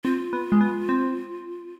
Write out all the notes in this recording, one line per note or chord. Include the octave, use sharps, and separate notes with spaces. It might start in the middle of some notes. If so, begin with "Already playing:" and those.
C4 F4
B3
G#3
B3
C4